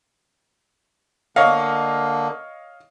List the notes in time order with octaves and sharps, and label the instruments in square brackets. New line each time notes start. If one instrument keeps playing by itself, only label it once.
[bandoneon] D3 A#3 [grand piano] C#5 D#5 F5